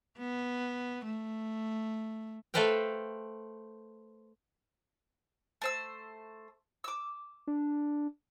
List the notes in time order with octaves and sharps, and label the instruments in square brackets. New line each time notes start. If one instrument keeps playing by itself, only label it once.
[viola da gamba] B3
A3
[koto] A3 A4 B4 C5 F5 G5
[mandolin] A3 C5 E6
D6 E6
[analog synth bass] D4